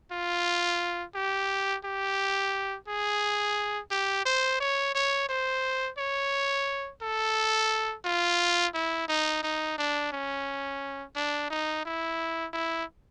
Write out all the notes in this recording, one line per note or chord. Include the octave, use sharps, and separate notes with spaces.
F4
G4
G4
G#4
G4
C5
C#5
C#5
C5
C#5
A4
F4
E4
D#4
D#4
D4
C#4
D4
D#4
E4
E4